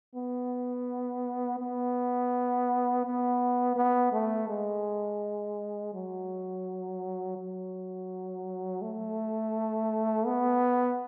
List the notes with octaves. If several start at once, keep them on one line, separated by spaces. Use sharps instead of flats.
B3
B3
B3
B3
A3
G#3
F#3
F#3
A3
B3